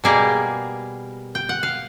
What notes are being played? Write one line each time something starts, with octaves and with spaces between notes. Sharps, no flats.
B2 G3 A#3 G#4 A#4
G5
F#5
F5